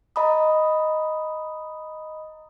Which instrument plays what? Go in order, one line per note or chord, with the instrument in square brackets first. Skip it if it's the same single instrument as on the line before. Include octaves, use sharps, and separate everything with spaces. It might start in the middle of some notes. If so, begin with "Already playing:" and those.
[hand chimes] D#5 A#5 B5 D#6